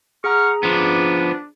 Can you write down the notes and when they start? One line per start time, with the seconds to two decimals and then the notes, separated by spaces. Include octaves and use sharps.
0.24 G#4 F#5 A#5 C#6 F6
0.63 F3 B3 D4